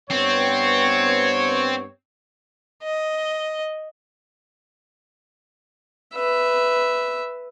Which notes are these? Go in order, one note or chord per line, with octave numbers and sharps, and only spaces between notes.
G2 B3 C4 C#5
D#5
B4 E5